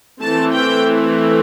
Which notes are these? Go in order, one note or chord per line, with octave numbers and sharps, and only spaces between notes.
E3 A3 C4 A5
G5